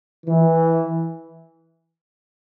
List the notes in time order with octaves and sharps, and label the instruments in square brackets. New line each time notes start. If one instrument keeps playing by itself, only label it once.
[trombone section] E3